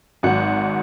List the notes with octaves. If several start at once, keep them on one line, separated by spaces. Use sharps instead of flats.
G#1 G#2 F#3 F#5